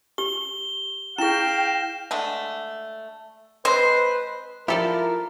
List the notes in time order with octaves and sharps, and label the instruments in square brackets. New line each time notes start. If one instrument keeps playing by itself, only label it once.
[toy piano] G4 [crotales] G7
[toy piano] E4 G#4 [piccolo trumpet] F5 [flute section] G5 [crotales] A#6 E7
[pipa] D3 G#3 A3
[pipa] G#3 C4 D#5 [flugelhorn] B4 [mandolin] C5
[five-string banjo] F3 [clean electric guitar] E4 F4 [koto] G4 A4 D5 [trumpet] A#4